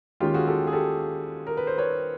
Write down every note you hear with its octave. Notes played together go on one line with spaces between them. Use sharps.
D#2 D#3 G#3 C#4 F4 G4
F#4 G#4
G4 A4
G#4
G4 A4
A#4
B4
C5
B4 C#5